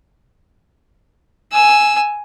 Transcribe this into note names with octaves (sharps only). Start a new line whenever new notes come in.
G#5 E6